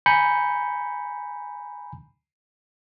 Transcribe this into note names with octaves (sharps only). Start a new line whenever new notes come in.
G#5 A#5 B5 G6 C#7